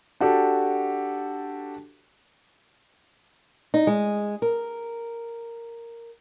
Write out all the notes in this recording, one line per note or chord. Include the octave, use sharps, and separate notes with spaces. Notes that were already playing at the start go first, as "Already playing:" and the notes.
D4 F#4 G4 A4
D#4
G#3
A#4